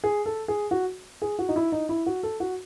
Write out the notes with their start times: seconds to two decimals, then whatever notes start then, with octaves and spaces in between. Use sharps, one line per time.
0.04 G#4
0.26 A4
0.48 G#4
0.71 F#4
1.22 G#4
1.39 F#4
1.49 D#4
1.56 E4
1.72 D#4
1.89 E4
2.06 F#4
2.23 A4
2.40 F#4